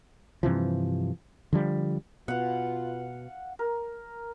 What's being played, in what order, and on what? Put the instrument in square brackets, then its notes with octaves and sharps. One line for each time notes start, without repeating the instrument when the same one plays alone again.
[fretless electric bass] G2 C3 E3 F3
D3 F3 G3
[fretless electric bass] B2 [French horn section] F4 B4 [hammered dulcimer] F5 F#5
[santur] A#4